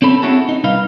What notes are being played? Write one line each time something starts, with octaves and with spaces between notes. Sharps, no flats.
C4 C#4 A4 B5
C4 C#4 E4 F#4 G#4 A4
D#4
C2 D#4 B4 F5